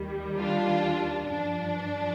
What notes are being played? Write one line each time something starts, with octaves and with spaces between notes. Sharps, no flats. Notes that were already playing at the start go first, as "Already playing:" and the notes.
Already playing: D#2 D#3 G3
D4 F4
G2 F3 D4